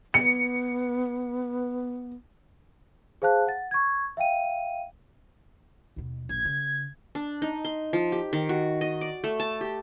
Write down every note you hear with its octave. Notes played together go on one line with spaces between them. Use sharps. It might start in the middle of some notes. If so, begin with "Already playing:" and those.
B3 C#7
G#4 C5 F5 A5 F#6
F#5 A6
C#6 G#6
E5 F5 G5 D#7
D#2 B2
A#1 D#3 G#6
C#3
D4
D#4
C6
F3
G4
D#3
F#4
D#5
D5
A3
A5
G4